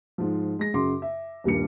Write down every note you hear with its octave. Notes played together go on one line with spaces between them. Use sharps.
G#2 F3
G#3 A#6
F#2 C#3 F#4 C6 D6
E5
D#1 G2 G3 A#3 C#7